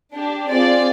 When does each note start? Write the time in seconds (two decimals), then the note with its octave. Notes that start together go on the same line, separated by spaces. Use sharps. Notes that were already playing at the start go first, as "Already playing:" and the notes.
0.13 D4 G4
0.49 C4 F4 G#4 D5